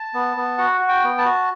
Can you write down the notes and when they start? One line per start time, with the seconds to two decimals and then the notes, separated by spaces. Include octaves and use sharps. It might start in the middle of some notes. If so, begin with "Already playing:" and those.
Already playing: A5
0.14 B3
0.37 B3
0.58 F#4 F#5
0.81 F#4
0.89 G5
1.04 B3
1.18 A5
1.25 F#4